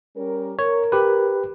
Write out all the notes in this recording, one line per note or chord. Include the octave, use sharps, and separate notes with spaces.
G3 C#4 A#4
A#4 C#5
G4 B4